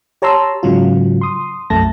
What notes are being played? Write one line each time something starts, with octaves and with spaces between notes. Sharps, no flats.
G4 C#5 A5 A#5 C6 E6
G#2 C#3 F#3 F4
C6 D#6
C2 F#2 A3 A5 A#6